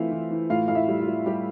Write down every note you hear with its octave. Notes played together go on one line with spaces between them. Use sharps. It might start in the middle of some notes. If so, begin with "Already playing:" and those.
Already playing: E3 A3 C4 F4 E5 F5
E3
E3
A2 F4 F5
A2 F5
E4 E5
G3
F4
G3
G3 G4